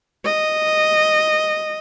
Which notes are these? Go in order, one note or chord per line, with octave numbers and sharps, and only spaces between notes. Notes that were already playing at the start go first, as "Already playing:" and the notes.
D#5